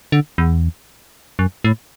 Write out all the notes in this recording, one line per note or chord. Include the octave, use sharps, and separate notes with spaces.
D3
E2
F#2
A2